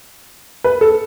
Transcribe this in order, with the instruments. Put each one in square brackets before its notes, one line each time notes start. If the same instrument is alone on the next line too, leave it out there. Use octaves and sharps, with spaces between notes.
[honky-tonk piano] B4
A4